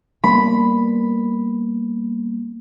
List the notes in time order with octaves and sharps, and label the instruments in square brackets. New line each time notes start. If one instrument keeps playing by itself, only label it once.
[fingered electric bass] G3 A#3 B3 [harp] B5